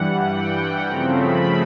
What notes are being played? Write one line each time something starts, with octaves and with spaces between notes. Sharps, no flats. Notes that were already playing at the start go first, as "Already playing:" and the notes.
Already playing: G2 E3 G3 F#5
G5
C#3 F3 A3 C4 A#5
B5